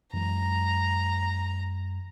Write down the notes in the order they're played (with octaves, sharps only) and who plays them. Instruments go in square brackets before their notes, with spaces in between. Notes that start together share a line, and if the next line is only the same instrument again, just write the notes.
[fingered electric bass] F#2 E3 G#3 [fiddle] A#5